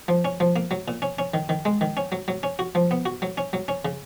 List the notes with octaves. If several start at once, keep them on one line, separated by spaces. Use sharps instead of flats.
F3
C#4
F3
A#3
F#3
A#2
C#4
C#4
D#3
D#3
G#3
D#3
C#4
F#3
F#3
C#4
F#4
F3
B3
F#4
F#3
C#4
F#3
C#4
C#3